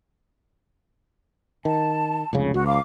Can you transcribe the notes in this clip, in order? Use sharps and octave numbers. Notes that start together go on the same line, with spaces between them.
D#3 A5
F1 C#2 C#3
C#2 F#4
F5 D6